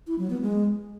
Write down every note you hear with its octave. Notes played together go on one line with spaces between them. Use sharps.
E4
F#3
B3
G#3